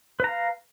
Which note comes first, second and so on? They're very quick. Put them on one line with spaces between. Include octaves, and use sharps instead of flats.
B4 A#5 F5